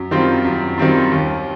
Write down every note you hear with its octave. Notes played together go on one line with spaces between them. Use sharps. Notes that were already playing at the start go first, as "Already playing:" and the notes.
Already playing: F#2
D#3 G3 C4 F4
F#2
D#3 G3 C4 F4
D#2